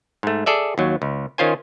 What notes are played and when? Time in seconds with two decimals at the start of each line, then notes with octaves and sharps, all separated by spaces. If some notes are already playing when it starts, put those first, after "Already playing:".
0.23 G#2 A3
0.46 G#4 A4 D5 E5
0.78 D#2 F#3
1.02 C#2
1.38 D#3 C#4 F4 C5 G#5